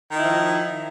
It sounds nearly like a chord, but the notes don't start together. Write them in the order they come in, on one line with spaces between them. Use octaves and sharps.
D#3 D#4 E4 F3